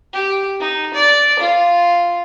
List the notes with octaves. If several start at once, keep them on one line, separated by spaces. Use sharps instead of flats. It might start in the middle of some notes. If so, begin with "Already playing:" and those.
G4
D#4
D5
F4